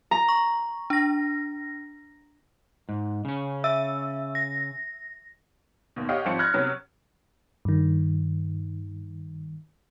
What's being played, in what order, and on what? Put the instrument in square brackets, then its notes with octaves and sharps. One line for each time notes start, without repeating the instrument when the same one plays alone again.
[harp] A#5
[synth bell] C#6
D4 A#6
[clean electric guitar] G#2
C#3 C#4
[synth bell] E5 E6
A#6
[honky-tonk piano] D#2 B2
G4 C#5 D#5 F5 F#5
G#1 F3 C4 C5 C#7
B5 F6 F#6 G#6 A#6
C3 F#3 B3 C#4
[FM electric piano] G2 D#3